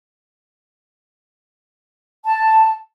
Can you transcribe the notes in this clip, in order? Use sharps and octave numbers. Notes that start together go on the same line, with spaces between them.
A5